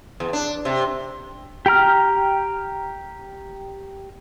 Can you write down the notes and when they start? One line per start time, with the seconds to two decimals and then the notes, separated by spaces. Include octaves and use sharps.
0.20 E2
0.33 D4
0.65 C3
1.66 G4 G5 A#5 F6